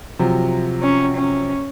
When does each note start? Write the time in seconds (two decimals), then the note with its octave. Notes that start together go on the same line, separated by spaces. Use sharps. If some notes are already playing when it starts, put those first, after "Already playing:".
0.19 C3 F3 F#3
0.82 C#4
1.17 C#4